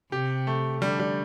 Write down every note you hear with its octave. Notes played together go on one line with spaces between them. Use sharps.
C3 G4
A3
D3 G3
G3